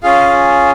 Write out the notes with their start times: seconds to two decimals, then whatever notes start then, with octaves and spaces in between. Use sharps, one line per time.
0.03 C#4 F4 G#4 F5